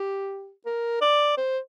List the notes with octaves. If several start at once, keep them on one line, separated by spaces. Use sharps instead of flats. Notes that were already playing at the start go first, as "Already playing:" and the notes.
Already playing: G4
A#4
D5
C5